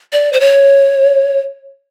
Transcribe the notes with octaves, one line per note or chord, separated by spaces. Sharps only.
D5
C5
C#5